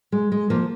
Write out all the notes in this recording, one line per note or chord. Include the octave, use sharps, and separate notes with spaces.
G#3
G#3
F3 A#3